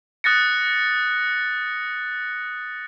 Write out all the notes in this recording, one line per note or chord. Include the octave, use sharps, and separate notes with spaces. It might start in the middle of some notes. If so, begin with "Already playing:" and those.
D#6 F#6 A6 A#6 C#7